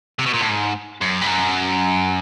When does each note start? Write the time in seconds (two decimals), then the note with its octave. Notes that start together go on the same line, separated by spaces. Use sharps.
0.19 C3
0.26 B2
0.34 A#2
0.41 A2
0.49 G#2
1.01 F#2
1.22 G2
1.27 F#2